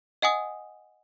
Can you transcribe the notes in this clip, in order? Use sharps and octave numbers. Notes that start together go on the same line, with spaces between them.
D#5 F#5 G#5 D#6